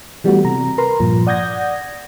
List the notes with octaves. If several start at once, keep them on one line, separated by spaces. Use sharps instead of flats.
E3 G3 A3 B3 F#4
C3 A#5
A#4 B4 A#5 C6
G2 A#2 F3
D5 F#5 D#6 G6 G#6 A#6